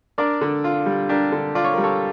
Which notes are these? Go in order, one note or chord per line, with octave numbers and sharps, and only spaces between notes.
D4 A#4 D5
D3
F4
G3
D4 G4 A#4
D3
F4 D5
C#5
G3 A#4
A4 C#5